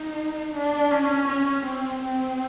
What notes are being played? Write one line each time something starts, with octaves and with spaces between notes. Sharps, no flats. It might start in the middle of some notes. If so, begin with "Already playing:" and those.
Already playing: D#4
D4
C#4
C#4
C4
C4